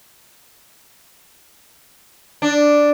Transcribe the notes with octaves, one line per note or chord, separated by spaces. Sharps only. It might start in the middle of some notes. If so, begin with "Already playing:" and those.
D4